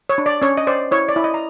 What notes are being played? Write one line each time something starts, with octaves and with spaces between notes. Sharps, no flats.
C#5
D4
D5
C#4 C#5
D#5
C5 D5
E4 C#5
D5
E4
D#5
A#5